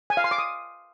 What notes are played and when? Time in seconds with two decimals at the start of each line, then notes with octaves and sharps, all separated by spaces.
0.10 G#5
0.17 F5
0.24 C6
0.31 D6
0.38 D#6